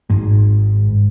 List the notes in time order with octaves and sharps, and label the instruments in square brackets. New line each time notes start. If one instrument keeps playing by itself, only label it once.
[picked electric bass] G#1 G#2 G#3